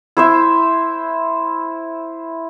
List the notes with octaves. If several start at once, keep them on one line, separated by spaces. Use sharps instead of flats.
E4 C5 E5